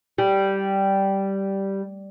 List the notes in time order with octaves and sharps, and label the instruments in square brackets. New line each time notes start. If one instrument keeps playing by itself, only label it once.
[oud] G3